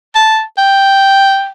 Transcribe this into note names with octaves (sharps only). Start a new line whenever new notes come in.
A5
G5